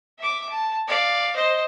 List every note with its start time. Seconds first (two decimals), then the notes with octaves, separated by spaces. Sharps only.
0.19 E5 D6
0.49 A5
0.88 D5 F5
1.36 C5 D#5